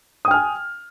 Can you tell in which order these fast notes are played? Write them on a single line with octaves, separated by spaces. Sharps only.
D#6 G5 F6 G#5